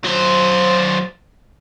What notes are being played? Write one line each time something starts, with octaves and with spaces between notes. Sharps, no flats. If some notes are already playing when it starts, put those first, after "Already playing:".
F#3 C5